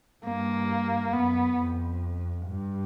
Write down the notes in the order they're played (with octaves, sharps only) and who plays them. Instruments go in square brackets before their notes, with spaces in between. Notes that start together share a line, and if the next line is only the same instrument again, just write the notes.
[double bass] G2 [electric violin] A#3
[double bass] F#2 [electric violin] B3
[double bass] F2
G2